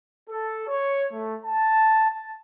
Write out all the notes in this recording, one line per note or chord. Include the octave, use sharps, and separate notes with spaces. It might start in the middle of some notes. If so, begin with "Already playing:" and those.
A4
C#5
A3
A5
A5